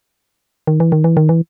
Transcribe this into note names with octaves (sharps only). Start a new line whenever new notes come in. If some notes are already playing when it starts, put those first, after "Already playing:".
D#3
E3
D#3
E3
D#3
E3